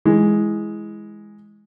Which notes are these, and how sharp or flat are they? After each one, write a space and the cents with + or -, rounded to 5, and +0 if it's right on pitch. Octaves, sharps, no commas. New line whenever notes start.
E3 +0 G#3 +0